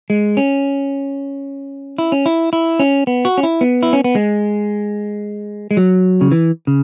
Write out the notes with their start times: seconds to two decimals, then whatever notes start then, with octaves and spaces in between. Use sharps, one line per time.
0.10 G#3
0.37 C#4
1.98 E4
2.12 C#4
2.26 E4
2.53 E4
2.79 C#4
3.07 B3
3.25 F#4
3.38 C#4
3.43 E4
3.61 B3
3.83 E4
3.93 C#4
4.04 B3
4.15 G#3
5.71 G#3
5.77 F#3
6.21 C#3
6.32 E3
6.67 C#3